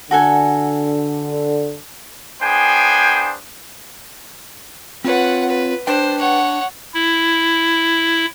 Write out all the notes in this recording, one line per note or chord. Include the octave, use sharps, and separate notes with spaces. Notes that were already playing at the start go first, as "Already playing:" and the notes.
D3 F#4 A4 G#5
B3 D4 G#4 C5 G5 G#5
C4 F4 B4 C#5 F#5
B4
D4 B4 C5 G5
C#5 F#5
E4